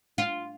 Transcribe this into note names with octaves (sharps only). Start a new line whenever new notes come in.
F4